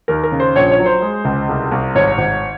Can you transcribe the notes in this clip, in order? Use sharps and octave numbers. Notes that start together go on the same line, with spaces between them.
D#2 A#4
A#4
C#3
C5
A#1 C#5
C#5
F#3
C5
G#3
C#2
C2
C2
G#1 C#5
G#1